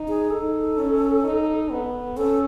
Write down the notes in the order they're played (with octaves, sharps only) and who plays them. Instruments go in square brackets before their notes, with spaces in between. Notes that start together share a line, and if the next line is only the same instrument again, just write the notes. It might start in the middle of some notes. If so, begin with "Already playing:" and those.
Already playing: [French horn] D#4
[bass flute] G#4
[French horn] D#4 [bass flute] A4
[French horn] C#4
D#4
B3
[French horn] C#4 [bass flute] A4